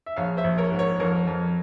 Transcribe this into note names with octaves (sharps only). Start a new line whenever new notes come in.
E5
A#1 C#5 F5
C5 E5
A#1
A#4 C#5
G#2
A#4 C#5
F2 A#4 C#5
F2